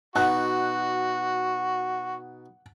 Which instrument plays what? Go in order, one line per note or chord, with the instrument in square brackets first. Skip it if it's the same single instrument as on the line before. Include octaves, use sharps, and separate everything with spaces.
[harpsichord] B2 D#4 [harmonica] F#4 [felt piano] F#5 F#6